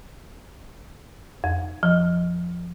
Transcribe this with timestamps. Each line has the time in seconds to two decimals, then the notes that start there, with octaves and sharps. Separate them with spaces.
1.44 F2
1.83 F3